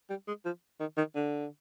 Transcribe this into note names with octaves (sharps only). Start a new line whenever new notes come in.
G3
G#3
F3
D#3
D#3
D3